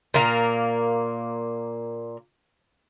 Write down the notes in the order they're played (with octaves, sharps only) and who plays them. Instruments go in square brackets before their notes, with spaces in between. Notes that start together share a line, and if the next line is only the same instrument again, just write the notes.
[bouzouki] A#2 A#3